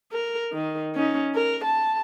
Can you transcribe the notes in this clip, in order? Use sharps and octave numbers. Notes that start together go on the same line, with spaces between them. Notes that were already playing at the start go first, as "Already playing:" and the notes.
A#4
D#3
C#4 D#4
A#4
A5